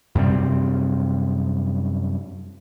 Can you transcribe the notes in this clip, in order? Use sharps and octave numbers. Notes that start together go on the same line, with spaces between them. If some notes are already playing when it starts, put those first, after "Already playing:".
F#2 C3 G3 C4